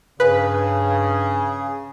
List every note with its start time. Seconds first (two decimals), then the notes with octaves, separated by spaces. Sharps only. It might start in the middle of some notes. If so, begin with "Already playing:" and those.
0.20 G2 C#3 G#4 B4